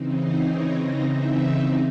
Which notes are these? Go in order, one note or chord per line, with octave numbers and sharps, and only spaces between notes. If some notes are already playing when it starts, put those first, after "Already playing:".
Already playing: C#3 E3 C4 D#4
C5
C#5
D#5
E5